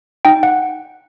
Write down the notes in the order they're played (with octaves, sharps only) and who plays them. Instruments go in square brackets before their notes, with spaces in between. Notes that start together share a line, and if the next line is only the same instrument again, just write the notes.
[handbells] D#4 G5
F#5